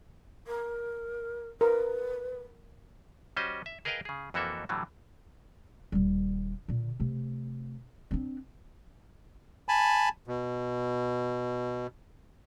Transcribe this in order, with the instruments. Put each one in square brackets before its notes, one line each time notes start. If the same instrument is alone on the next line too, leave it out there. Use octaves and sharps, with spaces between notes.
[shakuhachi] A#4
[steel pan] A#4 [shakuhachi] B4
[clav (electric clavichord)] G3 C#4 F#4 C5 D#5
E5
G#4 A#4 B4 D#5 F5 G5
C#3 G#4
F2 E3 A#3 F#4 A4 E5
A2 D3 E3 F#3 G3
[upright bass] D#1 G3
A#2 D3
C3 A3
C4 D4
[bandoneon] G#5 A5 B5
B2